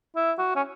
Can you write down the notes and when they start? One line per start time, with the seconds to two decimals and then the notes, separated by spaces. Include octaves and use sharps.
0.16 E4
0.38 F#4
0.56 C#4